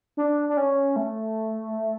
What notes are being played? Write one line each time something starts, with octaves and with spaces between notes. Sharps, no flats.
D4
D4
C#4
A3